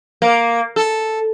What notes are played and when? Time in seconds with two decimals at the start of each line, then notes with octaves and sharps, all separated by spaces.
0.22 A#3
0.76 A4